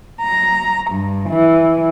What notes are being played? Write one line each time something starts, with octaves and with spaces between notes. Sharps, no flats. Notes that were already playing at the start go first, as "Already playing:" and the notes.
A#5
G2
E3